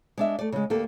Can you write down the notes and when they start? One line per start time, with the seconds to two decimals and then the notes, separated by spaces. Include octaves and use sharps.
0.18 G#3 D4 E5
0.39 A3 D5
0.52 C#3 G#3
0.70 D2 A#3 G4 A4